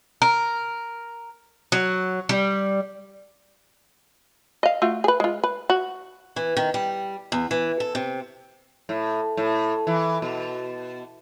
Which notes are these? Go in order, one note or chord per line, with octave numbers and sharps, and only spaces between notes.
A#4
F#3
G3
D#5 F5
A3 F4 F#4
G#4 B4
G#3 F4
B4
F#4
E3
D#3
G3
E2
E3
A4
C3
A2
A2
E3
B2